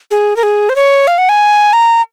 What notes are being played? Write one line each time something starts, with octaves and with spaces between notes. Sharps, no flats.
G#4
A#4
G#4
C5
C#5
F5
F#5
G#5
A#5